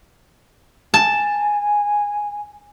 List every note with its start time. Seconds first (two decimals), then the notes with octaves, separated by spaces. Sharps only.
0.94 G#5 A5